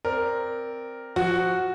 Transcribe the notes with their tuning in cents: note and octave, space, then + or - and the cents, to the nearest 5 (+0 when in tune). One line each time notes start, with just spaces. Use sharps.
C4 +0 A#4 +0 D5 +0
F3 +5 F#4 +0